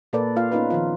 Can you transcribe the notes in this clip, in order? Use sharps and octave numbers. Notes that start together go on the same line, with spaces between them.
A#2 A#3 A4 B4 D5
A#3 F4 F5
B3 C#4 D#4 F4 B4
D#3 F3 F4